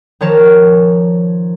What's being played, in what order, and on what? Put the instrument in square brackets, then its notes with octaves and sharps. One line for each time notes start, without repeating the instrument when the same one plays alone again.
[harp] D#3 F3 A#4 C#5 A5